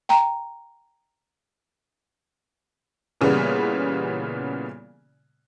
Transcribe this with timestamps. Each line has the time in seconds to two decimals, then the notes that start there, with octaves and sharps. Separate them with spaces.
0.09 G5 A#5
3.21 A#2 C#3 E3 G3 B3